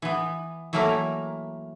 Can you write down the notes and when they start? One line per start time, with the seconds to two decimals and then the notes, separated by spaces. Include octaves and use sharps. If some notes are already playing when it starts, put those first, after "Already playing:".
0.02 E3 B3
0.73 E3 F#3 A3 A#3 E4 A#4